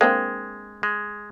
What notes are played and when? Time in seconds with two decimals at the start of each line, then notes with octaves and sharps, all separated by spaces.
0.01 G#3 A#3 C4 D4
0.83 G#3